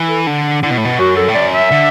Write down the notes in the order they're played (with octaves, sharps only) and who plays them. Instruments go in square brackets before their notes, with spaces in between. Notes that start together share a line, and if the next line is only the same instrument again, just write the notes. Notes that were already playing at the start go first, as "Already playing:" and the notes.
Already playing: [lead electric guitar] E3
[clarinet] A4
[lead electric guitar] D3 [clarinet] D4
[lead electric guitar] D3 [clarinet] E4
[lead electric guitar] B2
A2
B2
[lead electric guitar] F#2 [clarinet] F#4
[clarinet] A4
[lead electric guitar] A2
[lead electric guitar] F#2 [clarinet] D5
[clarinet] E5
[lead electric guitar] D3